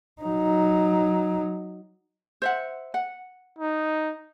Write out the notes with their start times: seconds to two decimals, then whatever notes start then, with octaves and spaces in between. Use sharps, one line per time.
0.22 F#3 D#4
2.42 C5 E5 F#5
2.94 F#5
3.59 D#4